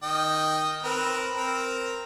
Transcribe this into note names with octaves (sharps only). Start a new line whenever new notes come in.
D#3 D#5 G5
C4 A#4 B4
C4 A#4